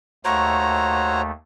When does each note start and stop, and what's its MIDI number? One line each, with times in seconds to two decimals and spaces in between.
0.25 1.31 39
0.25 1.31 57
0.25 1.21 66
0.25 1.21 72
0.25 1.21 73
0.25 1.22 82